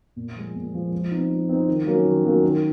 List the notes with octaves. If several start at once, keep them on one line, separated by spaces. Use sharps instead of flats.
A#2
F3 G#3
A#2
F3 G#3
F3
C4 D#4
F3
C4 D#4
D#3
F#3 A#3 C#4
D#3
F#3 A#3 C#4
D#3